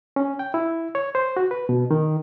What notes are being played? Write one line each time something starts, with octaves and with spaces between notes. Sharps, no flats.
C#4
G5
E4
C#5
C5
F#4
B4
B2
D#3